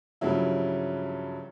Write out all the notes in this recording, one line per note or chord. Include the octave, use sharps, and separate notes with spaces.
G2 C#3 F3 F#3 E4